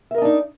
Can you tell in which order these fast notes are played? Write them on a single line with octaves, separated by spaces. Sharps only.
E5 A#4 D#5 D4 D#4